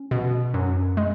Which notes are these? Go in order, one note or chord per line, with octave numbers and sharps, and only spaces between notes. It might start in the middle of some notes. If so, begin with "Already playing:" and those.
Already playing: C#4
B2
F#2
G#3